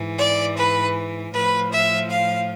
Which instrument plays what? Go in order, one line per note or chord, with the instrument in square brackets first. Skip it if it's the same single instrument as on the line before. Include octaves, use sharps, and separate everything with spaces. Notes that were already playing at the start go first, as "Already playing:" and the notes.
Already playing: [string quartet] G#2 E3
D5
B4
A2 F3 B4
E5
F5